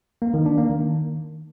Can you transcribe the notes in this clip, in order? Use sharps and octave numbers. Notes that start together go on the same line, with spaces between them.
A#3
D#3
D4
A#3
D#3